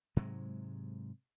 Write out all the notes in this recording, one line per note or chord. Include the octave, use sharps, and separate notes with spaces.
G#2 C3 F#3 G#3